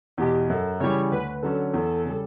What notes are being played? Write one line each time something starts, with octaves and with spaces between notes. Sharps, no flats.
E2 B2 G4
F#2 A4
C#3 E3 G3 C#5
D2 B4
D3 F#3 C#4 A4
E2 A4
C#3 G3